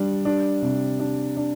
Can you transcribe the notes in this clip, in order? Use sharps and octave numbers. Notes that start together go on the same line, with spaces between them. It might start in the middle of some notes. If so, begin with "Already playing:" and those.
Already playing: G3 D4
D4
C3
D4
D4